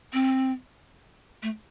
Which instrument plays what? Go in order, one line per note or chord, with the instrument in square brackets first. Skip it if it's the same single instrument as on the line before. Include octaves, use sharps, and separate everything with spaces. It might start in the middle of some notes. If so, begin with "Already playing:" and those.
[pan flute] C4
A3